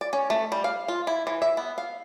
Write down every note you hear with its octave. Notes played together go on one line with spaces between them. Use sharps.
D5
C#4
A3
G3
F5
F4
E4
E3
E5
B3
F5